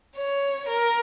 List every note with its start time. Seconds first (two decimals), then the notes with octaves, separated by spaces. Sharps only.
0.17 C#5
0.69 A#4